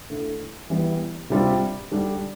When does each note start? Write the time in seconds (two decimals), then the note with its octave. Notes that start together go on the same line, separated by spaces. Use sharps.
0.10 D3 A3 E4
0.70 E3 G3 B3
1.30 C3 G3 D4 F4
1.91 D3 G3 D4